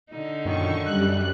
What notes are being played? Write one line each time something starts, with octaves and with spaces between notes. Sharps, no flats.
D3 D#4
F#2 A#2 D#3 C#6
F#2 G3 F#6